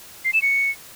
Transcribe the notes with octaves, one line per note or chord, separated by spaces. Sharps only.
C7
E7
C#7